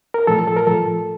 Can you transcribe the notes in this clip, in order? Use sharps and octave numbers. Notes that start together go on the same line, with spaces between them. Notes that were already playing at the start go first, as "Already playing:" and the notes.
A#4
A2 F3 A4
A4
A#4
A2 F3 A4